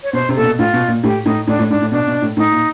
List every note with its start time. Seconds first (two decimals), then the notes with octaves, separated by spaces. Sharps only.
0.03 C#5
0.13 B2 C5
0.29 C3
0.36 A#2 A4
0.43 B2
0.59 A2 F4
0.73 B2
0.88 A#2
1.03 A2 G4
1.25 A2 D#4
1.47 A2 D4
1.59 A2
1.70 G#2 D4
1.82 A2
1.92 B2 D4
2.08 B2
2.22 A2
2.37 A2 D#4
2.52 A#2